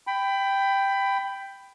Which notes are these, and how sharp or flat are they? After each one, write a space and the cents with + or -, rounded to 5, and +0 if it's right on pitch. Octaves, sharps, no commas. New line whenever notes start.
G5 +0 B5 +20